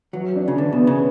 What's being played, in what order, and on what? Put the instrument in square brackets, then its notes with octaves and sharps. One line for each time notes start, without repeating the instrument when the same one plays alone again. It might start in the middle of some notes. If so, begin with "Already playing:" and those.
[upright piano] E3 [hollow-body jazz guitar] F#3
[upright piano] D4
[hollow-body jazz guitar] C#3
[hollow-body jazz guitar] D3 [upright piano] E3
[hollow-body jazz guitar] B2
[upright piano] B3
[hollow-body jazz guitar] C#3